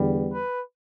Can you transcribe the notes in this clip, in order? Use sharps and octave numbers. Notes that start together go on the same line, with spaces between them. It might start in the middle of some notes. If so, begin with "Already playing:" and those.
Already playing: E2 D3 G3 B3
B4